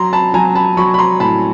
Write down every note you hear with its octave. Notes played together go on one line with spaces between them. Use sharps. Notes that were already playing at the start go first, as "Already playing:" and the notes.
Already playing: F#3 A#5 C6
A5 B5
F#3 G#5 A#5
A5 B5
F#3 B5 C#6
B5
A#5 C6
A2 A5 B5